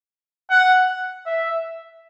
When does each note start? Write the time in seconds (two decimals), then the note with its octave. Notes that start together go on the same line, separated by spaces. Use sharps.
0.50 F#5
1.26 E5